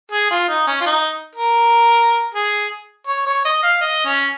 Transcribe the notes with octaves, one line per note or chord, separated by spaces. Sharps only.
G#4
F4
D#4
C#4
F4
D#4
A#4
G#4
C#5
C#5
D#5
F5
D#5
C#4